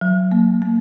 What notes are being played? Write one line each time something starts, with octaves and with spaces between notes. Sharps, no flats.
F#3
A#3
A#3